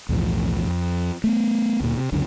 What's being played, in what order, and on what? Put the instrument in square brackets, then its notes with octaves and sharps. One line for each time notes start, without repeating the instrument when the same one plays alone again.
[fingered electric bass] B1 E2 A2 F3
F2
A3 B3
D2 A#2
C3
C#2 F#2 D3